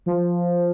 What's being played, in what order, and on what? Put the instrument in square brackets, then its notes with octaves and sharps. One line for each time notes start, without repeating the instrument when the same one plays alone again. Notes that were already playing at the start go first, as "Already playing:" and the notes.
[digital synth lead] F3